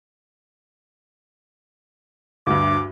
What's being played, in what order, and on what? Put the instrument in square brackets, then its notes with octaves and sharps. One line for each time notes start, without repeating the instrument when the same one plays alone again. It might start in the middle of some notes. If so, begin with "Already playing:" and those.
[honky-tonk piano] D2 G2 [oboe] D6